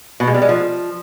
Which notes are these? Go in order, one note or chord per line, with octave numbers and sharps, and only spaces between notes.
B2
G#3
G3
G#3
F3